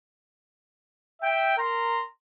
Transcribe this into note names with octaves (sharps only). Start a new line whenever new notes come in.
E5 G5
A#4 A#5 C6